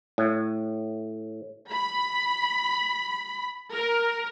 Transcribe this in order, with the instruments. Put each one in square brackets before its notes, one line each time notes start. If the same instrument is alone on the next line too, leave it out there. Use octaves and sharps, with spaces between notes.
[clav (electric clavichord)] A2
[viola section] B5
A#4